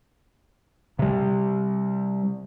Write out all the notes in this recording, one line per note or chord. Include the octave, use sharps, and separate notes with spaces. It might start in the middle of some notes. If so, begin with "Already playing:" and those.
C3 G3